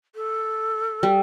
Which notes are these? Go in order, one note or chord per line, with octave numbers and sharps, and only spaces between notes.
A4
G3